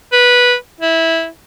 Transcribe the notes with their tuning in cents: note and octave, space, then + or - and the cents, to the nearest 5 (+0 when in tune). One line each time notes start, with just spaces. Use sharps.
B4 -10
E4 -10